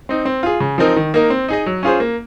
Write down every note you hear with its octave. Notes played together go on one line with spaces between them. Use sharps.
C4 D#4
C4
F4 G#4
C#3
F3 C4 D#4 A#4
D#3
A#3 D#4 A#4
C4
D#4 G#4 D#5
F#3
C#4 F4 G#4 C5
A#3